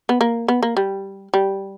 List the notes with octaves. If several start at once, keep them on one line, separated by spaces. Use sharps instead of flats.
B3
A#3
B3
A#3
G3
G3